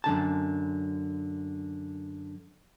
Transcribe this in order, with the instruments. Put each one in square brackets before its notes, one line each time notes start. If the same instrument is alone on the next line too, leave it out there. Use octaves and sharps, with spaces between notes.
[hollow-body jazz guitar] F#2 D3 A5